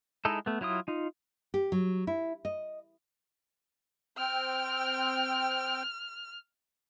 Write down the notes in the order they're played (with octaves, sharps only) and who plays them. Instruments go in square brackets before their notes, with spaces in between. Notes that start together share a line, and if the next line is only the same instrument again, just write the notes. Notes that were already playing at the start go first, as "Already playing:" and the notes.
[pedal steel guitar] G#3 D#4 E4 A4
A3 B3
F#3 E4 F4 D#6
D#4 F4
[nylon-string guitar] G4
F#3
E4
D#5
[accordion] C4 G5 [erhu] F6